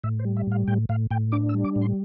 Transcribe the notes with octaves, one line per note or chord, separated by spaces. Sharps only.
A2 E5
C5
G3
E5
A2 F5
A2 G5
A2 F5
A2 G5
D4 D6
E6
G3
D6
A2
C6